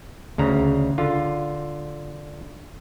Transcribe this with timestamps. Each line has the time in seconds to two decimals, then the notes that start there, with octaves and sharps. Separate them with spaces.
0.38 D2 C#3 A#5
0.98 D3 F4